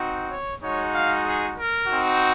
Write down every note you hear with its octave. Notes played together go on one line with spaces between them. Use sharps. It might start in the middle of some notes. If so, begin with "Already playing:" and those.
Already playing: C4 D#4 F#4
C#5
G#3 D#4 F#4 C#5
F5
G#4
A#4
C4 D#4 F#4